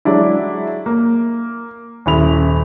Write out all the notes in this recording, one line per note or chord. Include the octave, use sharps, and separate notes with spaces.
F#3 G#3 D4 E4
A#3
D#1 F#2 E4 B5 F7